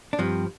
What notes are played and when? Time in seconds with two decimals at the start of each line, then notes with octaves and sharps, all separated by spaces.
0.13 D4
0.19 G2 F3 C4